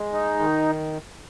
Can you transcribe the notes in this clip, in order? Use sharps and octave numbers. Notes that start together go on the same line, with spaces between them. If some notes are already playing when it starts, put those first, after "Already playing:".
Already playing: G#3
D#4
D#3